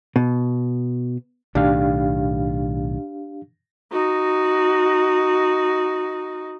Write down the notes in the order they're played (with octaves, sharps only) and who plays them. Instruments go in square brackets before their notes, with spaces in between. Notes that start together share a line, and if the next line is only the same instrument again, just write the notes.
[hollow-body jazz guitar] B2
[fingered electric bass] B1 A2 D#3 [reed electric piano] D4 G4 F5
[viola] D#4 F#4